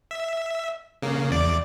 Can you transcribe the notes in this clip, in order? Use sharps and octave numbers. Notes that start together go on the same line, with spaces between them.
E5
C#3 A#3
E2 D5